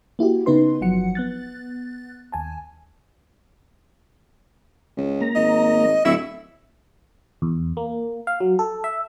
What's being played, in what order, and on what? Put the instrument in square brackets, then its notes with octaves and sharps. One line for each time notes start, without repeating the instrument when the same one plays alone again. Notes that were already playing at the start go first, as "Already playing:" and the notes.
[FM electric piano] A#3 E4 F#4 G4
C#3 B3 D#4 B4 C6
G1 F3 F#3 F#5 C#7
B3 F#6 A6
D#2 G#5 A5
[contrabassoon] C#2
[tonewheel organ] A#3 A#5
[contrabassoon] G#1 [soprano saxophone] D#5
[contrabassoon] D1 [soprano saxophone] E4 [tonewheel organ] C#6 E6
[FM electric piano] E2
A#3
F5
F#3
A4
E5